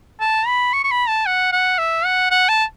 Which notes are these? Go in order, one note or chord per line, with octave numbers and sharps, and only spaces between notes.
A5
B5
C#6
C#6
B5
A5
F#5
F#5
E5
F#5
F#5
A5